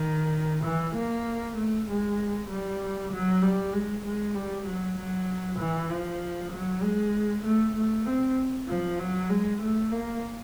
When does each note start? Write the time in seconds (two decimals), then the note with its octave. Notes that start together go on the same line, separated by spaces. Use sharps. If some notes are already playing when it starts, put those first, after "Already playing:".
Already playing: D#3
0.64 E3
0.96 A#3
1.57 A3
1.88 G#3
2.50 G3
3.12 F#3
3.42 G3
3.73 G#3
4.04 G#3
4.35 G3
4.66 F#3
4.97 F#3
5.59 E3
5.90 F3
6.52 F#3
6.83 G#3
7.44 A3
7.76 A3
8.06 C4
8.68 F3
8.99 F#3
9.30 G#3
9.62 A3
9.92 A#3